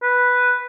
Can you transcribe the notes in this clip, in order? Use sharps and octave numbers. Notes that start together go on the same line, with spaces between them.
B4